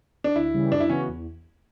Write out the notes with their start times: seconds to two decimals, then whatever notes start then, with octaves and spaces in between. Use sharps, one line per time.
0.24 D4
0.35 D2 E4
0.54 C#3 E3 G3 C#4
0.72 F#2 D4
0.80 E4
0.89 C#3 E3 B3 C#4 F#4
1.08 E2